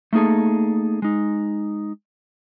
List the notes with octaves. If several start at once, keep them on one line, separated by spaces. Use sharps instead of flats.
A3 A#3 D#4 G#4 A4
G#3 D#4